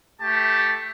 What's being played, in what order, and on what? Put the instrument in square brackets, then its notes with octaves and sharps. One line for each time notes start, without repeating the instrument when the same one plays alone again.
[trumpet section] A3 G4 A5